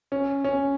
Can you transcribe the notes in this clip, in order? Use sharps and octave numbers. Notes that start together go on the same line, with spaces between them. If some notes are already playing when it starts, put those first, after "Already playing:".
C#4
C#4